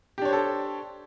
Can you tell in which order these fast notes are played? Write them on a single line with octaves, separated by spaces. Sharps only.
G4 D4 C#5 C5 A4